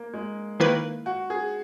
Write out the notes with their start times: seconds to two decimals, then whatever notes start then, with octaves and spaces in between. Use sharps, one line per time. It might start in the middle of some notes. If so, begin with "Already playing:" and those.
Already playing: A#3
0.14 G#3
0.60 D#3 A#3 E4 B4
1.06 F#4
1.30 G#4